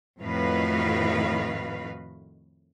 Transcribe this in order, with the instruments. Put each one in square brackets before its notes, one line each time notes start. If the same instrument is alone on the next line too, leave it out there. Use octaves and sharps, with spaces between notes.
[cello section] F2 A2 D#3 F#4 B4 F5